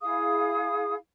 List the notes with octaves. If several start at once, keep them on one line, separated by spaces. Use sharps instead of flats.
E4 G#4 F5 D#6